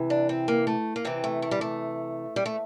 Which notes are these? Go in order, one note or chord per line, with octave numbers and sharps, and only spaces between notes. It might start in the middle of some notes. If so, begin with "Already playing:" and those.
Already playing: C3 E3
D4
C4
A#3
A3
A#3
C3 E3 C4
A3
A3
G3
A3
G3
A3